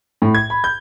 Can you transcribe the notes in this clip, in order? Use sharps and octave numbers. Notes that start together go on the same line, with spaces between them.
A2
G#6
B5
G6